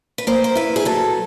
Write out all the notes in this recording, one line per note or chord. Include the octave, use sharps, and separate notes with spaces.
B4
A#3 C5
C5
E4 B4
G#4
F#3 A4